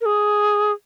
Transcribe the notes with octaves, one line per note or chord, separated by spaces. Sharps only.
A#4
G#4